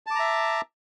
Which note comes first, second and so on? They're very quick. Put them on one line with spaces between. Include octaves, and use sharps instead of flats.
A5 D6 A#5 E5